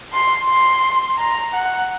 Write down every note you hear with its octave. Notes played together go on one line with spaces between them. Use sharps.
C6
C6
A#5
F#5